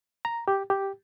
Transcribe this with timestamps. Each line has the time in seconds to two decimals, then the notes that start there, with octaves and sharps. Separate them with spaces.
0.25 A#5
0.48 G4
0.70 G4